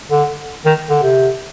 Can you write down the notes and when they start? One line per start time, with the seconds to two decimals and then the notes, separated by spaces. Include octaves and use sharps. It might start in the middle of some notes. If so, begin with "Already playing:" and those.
0.10 D3
0.65 D#3
0.89 D3
1.03 C3